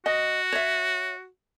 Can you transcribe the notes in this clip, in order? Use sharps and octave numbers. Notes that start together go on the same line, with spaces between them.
F#4 D#5
C#5 E5